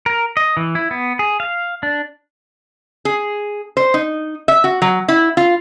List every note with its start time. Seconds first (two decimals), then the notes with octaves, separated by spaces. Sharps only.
0.06 A#4
0.37 D#5
0.57 E3
0.75 E4
0.91 B3
1.19 G#4
1.40 F5
1.83 D4
3.05 G#4
3.77 C5
3.94 D#4
4.48 E5
4.64 F#4
4.82 F#3
5.08 E4
5.37 F4